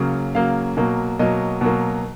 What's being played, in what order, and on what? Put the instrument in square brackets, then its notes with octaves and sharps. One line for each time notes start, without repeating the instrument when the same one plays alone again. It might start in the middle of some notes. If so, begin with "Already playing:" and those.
Already playing: [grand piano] C#3 F#3 A#3
C#3 F#3 A#3 F5
B2 F#3 A#3
B2 F#3 A#3 D#5
B2 F#3 A#3